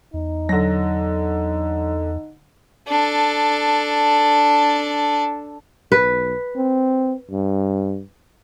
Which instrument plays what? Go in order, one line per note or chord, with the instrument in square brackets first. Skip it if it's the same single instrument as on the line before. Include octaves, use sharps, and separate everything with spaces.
[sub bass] E2 [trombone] D#4
[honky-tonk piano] D3 A#6 [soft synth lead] F#3
[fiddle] D4 A4
[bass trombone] B1 [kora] B4
[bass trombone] C4
G2